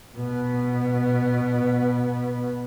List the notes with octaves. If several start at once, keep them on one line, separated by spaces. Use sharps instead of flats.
B2 B3